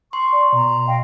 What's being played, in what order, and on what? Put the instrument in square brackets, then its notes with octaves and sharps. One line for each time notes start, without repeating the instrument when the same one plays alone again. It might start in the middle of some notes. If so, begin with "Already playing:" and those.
[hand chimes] C6 [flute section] C#6
[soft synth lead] D5
[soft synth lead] B2 [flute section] A#5
[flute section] D#5 F5 G5